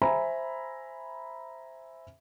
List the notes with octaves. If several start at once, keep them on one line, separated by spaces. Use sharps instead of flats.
C5 E5 G#5 A#5 B5